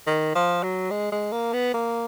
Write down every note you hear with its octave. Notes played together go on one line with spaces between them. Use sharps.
D#3
F3
F#3
G#3
G#3
A#3
B3
A#3